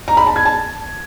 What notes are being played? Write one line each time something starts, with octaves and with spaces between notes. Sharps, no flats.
A#5
B5
A5
G#6
A5